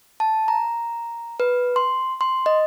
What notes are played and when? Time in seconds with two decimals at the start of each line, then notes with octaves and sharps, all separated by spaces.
0.20 A5
0.48 A#5
1.40 B4
1.76 C6
2.21 C6
2.46 D#5